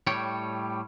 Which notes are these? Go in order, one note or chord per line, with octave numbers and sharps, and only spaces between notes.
A2 G3 C#5 G5